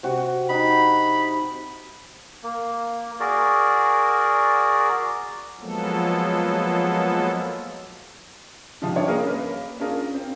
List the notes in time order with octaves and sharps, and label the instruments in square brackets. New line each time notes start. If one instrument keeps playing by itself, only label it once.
[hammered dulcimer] C3 F#4
[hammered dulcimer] D#4 [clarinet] B5
[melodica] A#3
F#4 G#4 A#4 D5
[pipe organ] F3 F#3 G#3 A#3 B3 A4
[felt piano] G#2 C3 F3
G3 D4 C#5
A#3 C#4 G#4 A#4
A#3 A#4 B4
C#4 D4 F4 G#4 A#4
C4